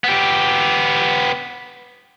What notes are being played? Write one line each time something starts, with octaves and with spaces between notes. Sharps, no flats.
B3 G4